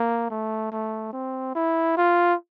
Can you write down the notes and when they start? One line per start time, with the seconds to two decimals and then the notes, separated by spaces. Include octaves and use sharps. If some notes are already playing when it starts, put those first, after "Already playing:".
Already playing: A#3
0.30 A3
0.72 A3
1.13 C4
1.55 E4
1.97 F4